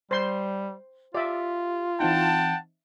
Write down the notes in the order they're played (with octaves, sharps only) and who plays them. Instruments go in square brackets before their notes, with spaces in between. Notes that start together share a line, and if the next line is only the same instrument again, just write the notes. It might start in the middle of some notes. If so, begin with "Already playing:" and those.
[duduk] G3 [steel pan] C5 C6
[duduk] F4 [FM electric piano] G4 [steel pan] D5 E5
[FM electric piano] E3 C4 D#4 [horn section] F#5 G5 A5